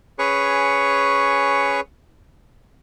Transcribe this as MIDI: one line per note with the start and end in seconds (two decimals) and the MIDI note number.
0.19 1.80 61
0.19 1.80 68
0.19 1.80 71
0.19 1.80 73
0.19 1.80 85